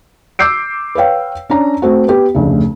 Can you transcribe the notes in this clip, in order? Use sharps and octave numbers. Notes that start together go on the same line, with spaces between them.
D6 E6 G6 C7 D7
B4 C#5 F5 G5
C#4 D4 A#5
A3 C4 F#4
B3 G4
F1 D2 C#3